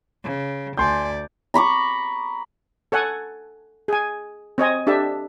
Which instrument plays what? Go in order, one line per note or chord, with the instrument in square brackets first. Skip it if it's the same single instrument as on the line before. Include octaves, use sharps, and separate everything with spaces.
[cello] C#3
[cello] D2 D5 [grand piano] G#5 C6 G6
[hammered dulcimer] A#5 B5 C#6 D6
[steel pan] A4 C#5 F#5 G#5
G#4 G#5
C4 C#5 D#5 G#5
D4 G4 A4 E5 A5